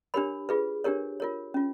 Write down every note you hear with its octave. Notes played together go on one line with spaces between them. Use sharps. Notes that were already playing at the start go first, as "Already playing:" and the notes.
D4 G4 A#4 C#5 B5
F4 G#4 B4
D4 G4 A#4 C#5
F4 A#4 C#5
C#4 F4